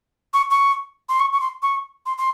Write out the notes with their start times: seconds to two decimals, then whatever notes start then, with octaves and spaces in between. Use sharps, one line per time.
0.33 C#6
0.51 C#6
1.09 C6
1.20 C#6
1.33 C#6
1.41 C6
1.62 C#6
2.06 C6
2.18 C6